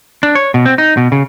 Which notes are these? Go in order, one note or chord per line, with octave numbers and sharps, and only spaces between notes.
D4
C#5
B2
C4
D#4
B2
C#3